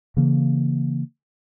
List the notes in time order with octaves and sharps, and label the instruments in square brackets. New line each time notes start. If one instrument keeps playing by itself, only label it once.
[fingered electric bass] C#3 E3 A#3